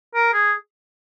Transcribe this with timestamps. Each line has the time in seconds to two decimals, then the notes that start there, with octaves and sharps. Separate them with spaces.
0.15 A#4
0.34 G#4